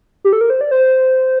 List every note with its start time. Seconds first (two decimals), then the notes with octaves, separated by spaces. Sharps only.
0.25 G4
0.33 A4
0.41 A#4
0.50 C5
0.61 D5
0.71 C5